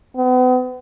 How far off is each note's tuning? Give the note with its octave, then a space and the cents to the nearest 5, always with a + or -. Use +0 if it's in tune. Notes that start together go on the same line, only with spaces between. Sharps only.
B3 +40